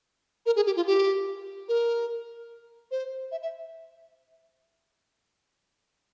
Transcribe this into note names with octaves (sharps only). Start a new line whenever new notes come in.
A#4
G#4
G4
F4
G4
A#4
C5
E5
E5